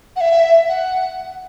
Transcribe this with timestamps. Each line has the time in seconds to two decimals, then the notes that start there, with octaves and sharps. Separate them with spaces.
0.16 F#5
0.21 E5
0.68 F#5